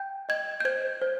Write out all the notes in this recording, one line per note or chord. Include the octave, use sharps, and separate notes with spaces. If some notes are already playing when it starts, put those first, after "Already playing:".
Already playing: G5 G6
D#5 G#6
G6
C5 G#6
C5